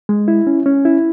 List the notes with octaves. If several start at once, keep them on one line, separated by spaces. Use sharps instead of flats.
G#3
E4
C#4
C#4
E4